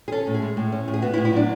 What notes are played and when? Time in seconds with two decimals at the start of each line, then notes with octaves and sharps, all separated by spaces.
0.08 G#4
0.12 C#4 A4
0.27 A2
0.34 G#4
0.42 G#3
0.57 A2
0.72 C#4
0.88 A2
0.94 G#4
1.02 B3 F#4
1.14 E4
1.18 A2
1.25 E4
1.33 F#3 D4